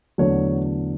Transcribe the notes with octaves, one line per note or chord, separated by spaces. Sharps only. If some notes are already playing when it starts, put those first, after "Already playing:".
E2 D3 F#3 A3 C#5